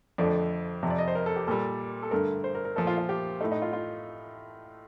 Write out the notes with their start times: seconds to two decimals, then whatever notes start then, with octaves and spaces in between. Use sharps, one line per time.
0.18 F2 D3 F3 A3 D5
0.83 F2 C3 F3
0.90 D5
0.98 D#5
1.08 C5
1.15 A#4
1.26 A4
1.36 G4
1.47 A#2 G3 A4
2.03 A4
2.11 G2 D3 A3 A#4
2.44 C5
2.55 A#4
2.65 A#4
2.76 A#2 F3 A3 A4
2.87 F4
2.98 F4
3.09 G4
3.41 A3 D#4
3.44 A2
3.52 D#4
3.62 F4
3.73 F4